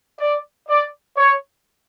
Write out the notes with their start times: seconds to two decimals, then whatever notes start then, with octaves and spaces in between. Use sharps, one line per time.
0.19 D5
0.68 D5
1.16 C#5